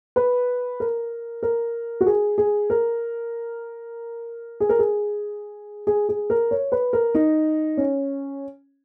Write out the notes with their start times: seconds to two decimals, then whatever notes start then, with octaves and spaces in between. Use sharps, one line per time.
0.16 B4
0.80 A#4
1.43 A#4
2.01 F#4
2.06 G#4
2.38 G#4
2.70 A#4
4.60 G#4
4.69 A#4
4.79 G#4
5.87 G#4
6.09 G#4
6.30 A#4
6.51 C#5
6.72 B4
6.93 A#4
7.15 D#4
7.77 C#4